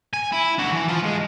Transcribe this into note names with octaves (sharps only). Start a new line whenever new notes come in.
G#5
E4
D4 F#4
E3
F4 A5
G#2 G#3